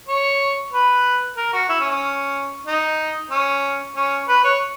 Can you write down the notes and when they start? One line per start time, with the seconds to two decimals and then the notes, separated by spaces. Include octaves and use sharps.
0.08 C#5
0.72 B4
1.37 A#4
1.53 F#4
1.69 E4
1.80 C#4
1.91 C#4
2.66 D#4
3.31 C#4
3.96 C#4
4.28 B4
4.44 C#5